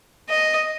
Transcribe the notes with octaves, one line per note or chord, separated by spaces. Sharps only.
D#5